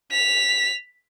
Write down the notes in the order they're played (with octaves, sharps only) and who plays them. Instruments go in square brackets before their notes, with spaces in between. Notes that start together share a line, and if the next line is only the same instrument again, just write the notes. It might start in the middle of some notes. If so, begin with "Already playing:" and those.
[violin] B6 F7